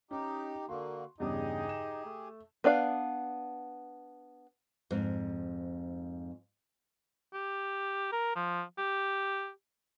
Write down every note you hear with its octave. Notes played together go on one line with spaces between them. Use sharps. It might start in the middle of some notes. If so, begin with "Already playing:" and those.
C#4 D#4 G4
D3 A#3 F#4 C6
E2 G2 C#3 D#4 G4 G#4
E7
A3
B3 D4 D5 F5
F2 G#2
G4
A#4
F3
G4